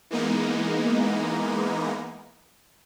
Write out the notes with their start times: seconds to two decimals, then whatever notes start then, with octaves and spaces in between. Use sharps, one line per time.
0.11 E3 G#3 A#3 B3 D#4